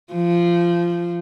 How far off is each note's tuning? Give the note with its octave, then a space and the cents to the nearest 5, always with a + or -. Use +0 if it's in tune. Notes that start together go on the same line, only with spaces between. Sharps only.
F3 -20